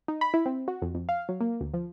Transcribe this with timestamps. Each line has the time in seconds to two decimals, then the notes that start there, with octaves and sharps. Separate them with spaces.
0.08 D#4
0.21 B5
0.34 E4
0.46 C4
0.68 F#4
0.82 F2
0.94 F2
1.09 F5
1.29 F#3
1.41 A#3
1.61 D2
1.74 F3